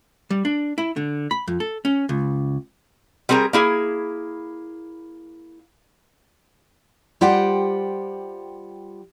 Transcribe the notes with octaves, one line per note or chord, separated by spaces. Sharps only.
G3
D4
E4
D3
B5
F2
A4
C#4
C#2
G3 C4 G#4 A#4 A#5
A#3 E4 G#4
G3 F4 G4 C5 F#5 G5